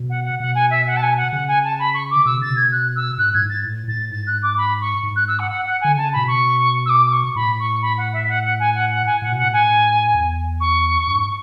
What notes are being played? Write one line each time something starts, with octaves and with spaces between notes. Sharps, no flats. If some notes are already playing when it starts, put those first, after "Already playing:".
Already playing: B2
F#5
F#5
B2 F#5
G#5
E5
F#5
A5
G#5
F#5
C#3 F#5
G#5
A5
B5
C#6
D6
B2 E6
C#3 A6
B2
G#6
F#6
E6
G#2 F#6
A2 G#6
G#2
A6
A2
A2 A6
G#2 A6
F#6
D6
B5
C#6
G#2
F#6
E6
F#5
F#5
F#5
D3 G#5
C#3 A5
A2 B5
B2
C#6
E6
D6
D6
C#6
A2 B5
C#6
B5
F#5
E5
F#5
F#5
G#5
F#5
F#5
G#5
A2 F#5
B2 F#5
A2
G#5
E2
C#6
F#2
G#2